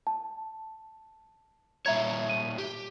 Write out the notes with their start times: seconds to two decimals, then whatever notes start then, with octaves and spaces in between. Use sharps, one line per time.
0.07 A5
1.86 A#2 G3 C#5 E5 A#5 G#6
2.29 D#7
2.58 G4